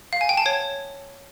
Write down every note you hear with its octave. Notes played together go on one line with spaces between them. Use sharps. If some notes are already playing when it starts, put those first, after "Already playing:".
F5
G#5
G5
A5
C#5